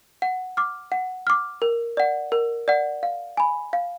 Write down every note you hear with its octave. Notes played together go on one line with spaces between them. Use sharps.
F#5
D6 F6
F#5
D6 F6
A#4
D5 F#5
A#4
D5 F#5
F5
G#5 B5
F5